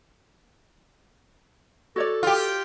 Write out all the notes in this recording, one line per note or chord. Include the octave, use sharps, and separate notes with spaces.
F#4 A4 C#5 D5
F4 G4